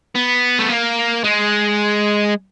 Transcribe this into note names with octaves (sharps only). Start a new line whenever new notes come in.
B3
A3
A#3
G#3